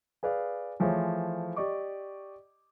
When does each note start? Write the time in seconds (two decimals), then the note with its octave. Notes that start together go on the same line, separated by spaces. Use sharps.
0.23 G#4 B4 D5 F5
0.80 E3 F3 A3 G#4 C5 C#5
1.56 G4 D5 D#5 C#6 D6